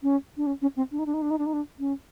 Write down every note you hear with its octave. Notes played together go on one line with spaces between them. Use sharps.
C#4
D4
C#4
C#4
C4
D4
D#4
D4
D#4
D4
D#4
D4
D#4
D4
C#4